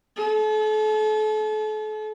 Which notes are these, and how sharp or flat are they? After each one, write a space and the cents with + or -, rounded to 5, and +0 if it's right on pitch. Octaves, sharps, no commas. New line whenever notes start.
A4 -40